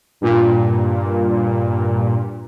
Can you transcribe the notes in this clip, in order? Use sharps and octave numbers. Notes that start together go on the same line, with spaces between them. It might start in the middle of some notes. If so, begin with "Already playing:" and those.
G2 A#2